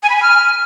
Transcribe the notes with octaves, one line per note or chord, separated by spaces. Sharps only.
G#5
B5
G#5
F6